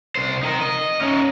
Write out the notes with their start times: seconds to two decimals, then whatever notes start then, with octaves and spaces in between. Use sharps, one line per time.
0.15 C2 C5
0.43 D#4 A#4
0.61 D#5
1.01 C#4 D#4